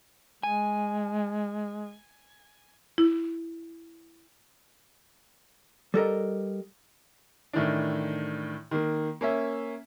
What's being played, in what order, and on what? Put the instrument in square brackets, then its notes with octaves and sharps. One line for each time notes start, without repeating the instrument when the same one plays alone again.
[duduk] G#3 [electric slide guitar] G#5
[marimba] E4
[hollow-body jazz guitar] G3 A4 A#4 D#5
[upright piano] A2 D#3 E3 D4
D#3 A#3
A#3 C#4 E5